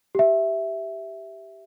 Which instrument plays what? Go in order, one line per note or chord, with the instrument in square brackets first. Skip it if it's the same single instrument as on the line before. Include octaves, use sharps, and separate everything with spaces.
[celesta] G4 E5